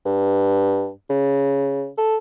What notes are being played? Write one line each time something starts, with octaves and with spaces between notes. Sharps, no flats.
G2
C#3
A4